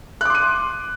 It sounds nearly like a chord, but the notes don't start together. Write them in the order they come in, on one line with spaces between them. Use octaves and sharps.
F#6 D6 C6 D#7